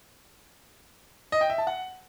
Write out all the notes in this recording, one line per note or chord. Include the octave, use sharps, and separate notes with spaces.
D#5
G5
E5
A5
F#5